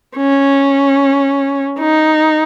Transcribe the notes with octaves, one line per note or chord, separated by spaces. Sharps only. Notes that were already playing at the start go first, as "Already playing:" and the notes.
C#4
D#4